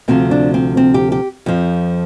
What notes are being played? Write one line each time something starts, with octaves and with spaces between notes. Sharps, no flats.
D2 C3 F3 C4
D4
C4
C4
G4
G4
F2 F3